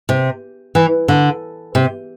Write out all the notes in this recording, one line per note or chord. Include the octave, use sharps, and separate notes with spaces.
C3
E3
D3
C3